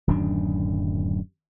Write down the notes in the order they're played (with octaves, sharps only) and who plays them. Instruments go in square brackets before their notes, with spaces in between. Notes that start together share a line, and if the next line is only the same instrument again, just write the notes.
[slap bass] D1 F#2 D#3 D4